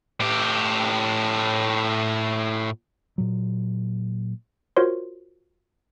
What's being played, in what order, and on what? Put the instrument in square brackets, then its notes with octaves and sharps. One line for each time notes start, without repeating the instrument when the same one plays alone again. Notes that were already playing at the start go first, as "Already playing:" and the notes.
[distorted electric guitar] A2 G4
[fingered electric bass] A#2 F#3
[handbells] F4 F#4 A#4 C5 C#5 C6